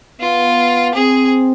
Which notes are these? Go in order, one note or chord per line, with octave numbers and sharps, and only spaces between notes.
B3 F4
C4 G#4